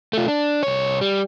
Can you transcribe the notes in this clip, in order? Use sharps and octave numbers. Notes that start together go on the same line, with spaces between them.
A3 F4
D4
C2 C#5
G3